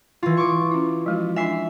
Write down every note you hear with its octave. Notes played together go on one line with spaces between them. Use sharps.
E3 E4 F4
C#6 D6
C#4 E4
F3 G#3 F#4
D4 F4 E5 G#5 C7